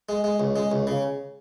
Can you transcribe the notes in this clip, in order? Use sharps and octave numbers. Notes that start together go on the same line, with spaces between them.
G#3
G#3
C#2
G#3
C#2
C#3